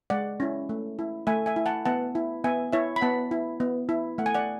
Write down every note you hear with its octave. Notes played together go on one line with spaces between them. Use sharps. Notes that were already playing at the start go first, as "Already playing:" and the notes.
G#3 D5 F#5
C#4 E4
A3
E4
A3 E5 G#5
E5 G#5
E4
F#5 A5
B3 F#5 A5
E4
B3 E5 G#5
E4 C#5 E5
B5
B3 F#5 A5
E4
B3
E4
A3 F#5
G#5
D5 F#5